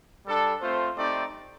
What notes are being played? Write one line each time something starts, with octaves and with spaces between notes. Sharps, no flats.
G3 D4 A4
A3 C4 F4 C5
A3 C4 D#4 G4 D5